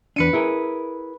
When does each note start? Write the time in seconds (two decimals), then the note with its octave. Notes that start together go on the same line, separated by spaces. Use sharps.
0.16 E2 D4 B4 C#7 D#7
0.33 E4 G#4 A#4